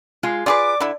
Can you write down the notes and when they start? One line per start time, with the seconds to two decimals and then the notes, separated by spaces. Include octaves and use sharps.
0.23 G#3 F4
0.46 F4 G#4 B4 D5 D6
0.80 D3 E4